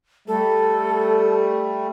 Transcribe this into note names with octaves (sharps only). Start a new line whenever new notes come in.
G3 A3 A4